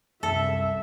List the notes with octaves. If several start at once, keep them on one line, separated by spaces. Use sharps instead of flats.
C2 F#2 A4 E5